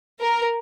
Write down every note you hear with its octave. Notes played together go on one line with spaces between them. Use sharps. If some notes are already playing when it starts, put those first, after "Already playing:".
A#4